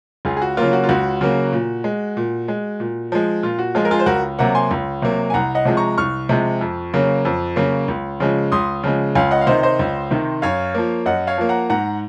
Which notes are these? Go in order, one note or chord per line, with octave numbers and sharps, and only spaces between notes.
C#2 F4 G#4
G#4
F#4
C#3 F#3 A#3 F4
F#4
F4
C#2 F#4
C#3 F#3 A#3
A#2
G#3
A#2
G#3
A#2
F3 G#3
A#2 F4
F#4
F3 G#3 F4 G#4
A#4
F4 G#4
C5
C#2 F#4 A#4
C3 F#3 A#3 F#5 A#5
G#5 C6
C#2
C3 F#3 A#3
G#5
C2 F#5 A#5
D#5 F#5
C3 F3 G#3
A#5 C#6
C2 C#6 F6
C3 F3 G#3
F2
C#3 F#3 A#3
F2
C#3 F#3 A#3
C#2
C#3 F3 G#3
C#2 C6 D#6
C#3 F3 G#3
C#2 F5 G#5
D#5 F#5
F5
C3 D#3 C5 D#5
C5 D#5
C#2
C3 D#3
F#2 C#5 F5
F3 A#3
F#2 D#5 F#5
C#5 F5
F3 A#3
F#5 A#5
G#2 F#5 A#5